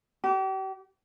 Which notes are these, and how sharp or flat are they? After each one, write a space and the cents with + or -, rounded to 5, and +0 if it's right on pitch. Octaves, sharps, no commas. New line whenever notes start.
G4 -40